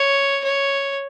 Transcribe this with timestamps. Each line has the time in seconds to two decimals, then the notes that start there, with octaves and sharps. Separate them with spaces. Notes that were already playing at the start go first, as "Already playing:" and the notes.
Already playing: C#5
0.44 C#5